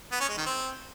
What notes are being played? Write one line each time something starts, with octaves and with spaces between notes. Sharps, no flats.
B3
C#4
G#3
D#3
C4